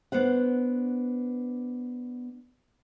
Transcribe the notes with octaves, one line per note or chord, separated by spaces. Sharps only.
B3 D4 C5 F#5